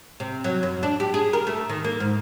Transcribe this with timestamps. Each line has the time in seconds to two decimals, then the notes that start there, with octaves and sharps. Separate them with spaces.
0.20 C3
0.44 F#3
0.63 F#2
0.83 D4
1.00 G4
1.14 G#4
1.33 A#4
1.47 A3
1.69 D#3
1.84 A#3
2.00 G#2